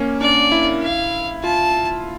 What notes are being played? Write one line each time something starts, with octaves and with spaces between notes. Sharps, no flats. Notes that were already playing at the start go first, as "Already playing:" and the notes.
Already playing: A#3 C#4
D4 D5
E4
F5
F4 A5